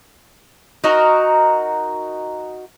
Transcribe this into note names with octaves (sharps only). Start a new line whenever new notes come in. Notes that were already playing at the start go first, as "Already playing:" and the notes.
D#4 F#4 A#4